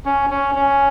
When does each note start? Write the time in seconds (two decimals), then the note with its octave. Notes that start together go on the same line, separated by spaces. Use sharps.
0.05 C#4
0.30 C#4
0.55 C#4